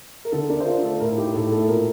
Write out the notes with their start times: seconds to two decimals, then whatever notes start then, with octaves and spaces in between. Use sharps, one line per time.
0.25 A#4
0.32 D3 A4
0.49 D4 A#4
0.60 C5
0.66 F4 A#4
0.83 A3 A4
1.00 A2 A#4
1.17 D#4 G4
1.34 A2 A4
1.51 A3 A4
1.68 A#2 A#4